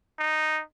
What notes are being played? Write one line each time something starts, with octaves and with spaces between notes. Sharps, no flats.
D#4